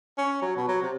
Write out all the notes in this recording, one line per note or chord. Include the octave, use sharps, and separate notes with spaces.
C#4
F#3
B2
F#3
C3